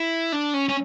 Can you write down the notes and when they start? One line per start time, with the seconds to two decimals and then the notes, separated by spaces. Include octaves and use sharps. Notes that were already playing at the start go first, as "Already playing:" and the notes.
Already playing: E4
0.32 D4
0.54 C#4
0.69 C#4